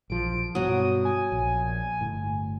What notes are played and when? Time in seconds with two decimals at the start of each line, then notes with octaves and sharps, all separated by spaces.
0.10 A#1 F3 D7
0.55 G2 B2 F#3 F#4 D#6
1.05 G#5
1.32 A#1
2.01 G1 A2